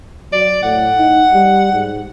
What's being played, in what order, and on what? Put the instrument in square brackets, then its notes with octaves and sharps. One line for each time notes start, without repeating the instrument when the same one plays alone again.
[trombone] F#3 [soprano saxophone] D5
[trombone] A2 [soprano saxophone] F#5
[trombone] D#4
G3
G#2